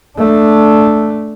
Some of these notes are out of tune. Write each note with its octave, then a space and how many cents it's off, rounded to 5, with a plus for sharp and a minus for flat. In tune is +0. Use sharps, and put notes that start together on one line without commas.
A3 +0 D4 +0